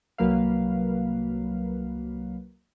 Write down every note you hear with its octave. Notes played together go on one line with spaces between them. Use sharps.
C2 F#3 A#3 B4 F5